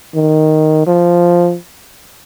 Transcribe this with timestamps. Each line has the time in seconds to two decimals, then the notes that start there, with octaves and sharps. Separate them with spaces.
0.15 D#3
0.87 F3